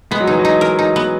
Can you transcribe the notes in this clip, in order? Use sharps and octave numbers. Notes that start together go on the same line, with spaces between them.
G#3 B3
F#3
E3 D#4
F#3
D#4
A#4
D#4
B3